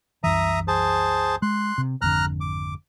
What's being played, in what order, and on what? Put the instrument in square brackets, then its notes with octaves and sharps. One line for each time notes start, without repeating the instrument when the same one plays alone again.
[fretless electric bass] C2 F#2 E3 [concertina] E5 A#5 D#6
[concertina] G#4 C5 A5
[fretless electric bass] G#3 [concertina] C6 F#6
[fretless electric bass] C3
[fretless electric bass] G#1 F2 D3 [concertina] A#5 F6 F#6
[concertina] D6